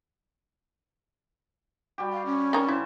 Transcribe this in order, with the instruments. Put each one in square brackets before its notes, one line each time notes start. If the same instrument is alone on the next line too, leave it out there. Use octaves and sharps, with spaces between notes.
[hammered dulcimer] G3 F#4 G4
[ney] F5
C#4
[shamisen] C4 D#4 A#4 [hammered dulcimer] C#5 A5
[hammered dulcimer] C#3 C5 [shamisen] E4